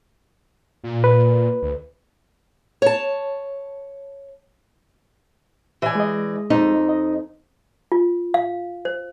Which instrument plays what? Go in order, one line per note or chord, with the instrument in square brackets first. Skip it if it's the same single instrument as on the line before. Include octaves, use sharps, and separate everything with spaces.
[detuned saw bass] A#2
[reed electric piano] B4
[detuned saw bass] D2
[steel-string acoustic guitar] C#5 A5
E3 D5 G#5
[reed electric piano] G#3 G#4 D#5
[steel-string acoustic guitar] F2 [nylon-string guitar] D#4
[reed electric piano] D#5
[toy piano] F4
F5
C5